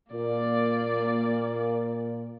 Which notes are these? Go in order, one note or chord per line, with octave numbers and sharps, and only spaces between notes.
A#2 A#3 D5